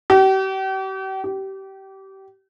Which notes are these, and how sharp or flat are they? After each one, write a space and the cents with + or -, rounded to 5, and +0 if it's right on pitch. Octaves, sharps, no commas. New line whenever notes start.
G4 -40
G4 -25